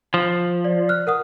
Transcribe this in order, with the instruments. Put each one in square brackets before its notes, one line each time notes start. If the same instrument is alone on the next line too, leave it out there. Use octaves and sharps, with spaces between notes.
[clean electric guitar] F3
[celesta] D5
F6 F#6
A#4 F#5 D#6